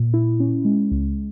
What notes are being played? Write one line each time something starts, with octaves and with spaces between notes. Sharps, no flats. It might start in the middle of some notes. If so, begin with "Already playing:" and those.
Already playing: A#2
E4
C#4
G#3
C#2